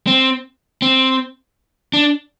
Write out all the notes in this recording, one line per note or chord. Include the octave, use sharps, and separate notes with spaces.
C4
C4
D4